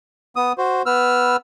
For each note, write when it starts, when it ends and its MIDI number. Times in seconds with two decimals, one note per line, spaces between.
0.36 0.53 59
0.36 0.53 87
0.58 0.82 66
0.58 0.82 72
0.86 1.36 59
0.86 1.36 71
0.86 1.36 88
0.86 1.36 89